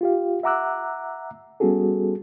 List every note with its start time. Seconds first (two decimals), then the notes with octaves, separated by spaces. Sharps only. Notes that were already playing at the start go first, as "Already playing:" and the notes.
0.01 F4 G4 F5
0.43 E5 F#5 A#5 D6 E6 F#6
1.60 G3 B3 C#4 F#4 G#4 A4